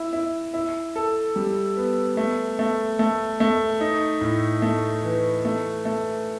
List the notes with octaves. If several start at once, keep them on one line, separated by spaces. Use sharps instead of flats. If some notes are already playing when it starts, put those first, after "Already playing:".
Already playing: E4
E4
E4
A4
G3
B3
A3
A3
A3
A3
D#4
A2
A3
E3
A3
A3